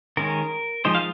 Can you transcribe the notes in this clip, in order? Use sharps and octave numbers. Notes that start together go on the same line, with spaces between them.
D#3 G#3 C#4 A#4
F3 G#3 D#4 C5
F5